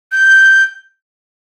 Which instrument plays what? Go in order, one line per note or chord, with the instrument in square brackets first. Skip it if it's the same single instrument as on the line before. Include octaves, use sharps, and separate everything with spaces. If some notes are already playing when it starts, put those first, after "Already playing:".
[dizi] G6